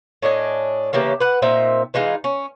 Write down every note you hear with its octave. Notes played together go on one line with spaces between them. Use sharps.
A2 D4 D#5 G#5
C#3 E3 A#3 G4
B4 F#5
A#2 C4 D#4 E5
E3 G#3 D#4 F4
C#4